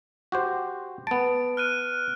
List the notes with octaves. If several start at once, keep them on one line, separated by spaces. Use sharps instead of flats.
F#4 G4 C5
B3 A5 D7
F6 F#6 D#7